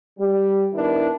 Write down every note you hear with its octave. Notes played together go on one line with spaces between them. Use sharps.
G3
D#3 B3 D4 E4 A#4